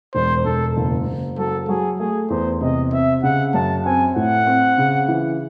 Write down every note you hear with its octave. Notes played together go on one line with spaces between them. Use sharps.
E1 C5
E1 A4
F#1
F#1
F#3 A4
F#3 G#4
A3 G#4
E2 C5
C3 D#5
C4 E5
C#3 F#5
F#2 A5
C4 G#5
A2 F#5
C4
C#3
E3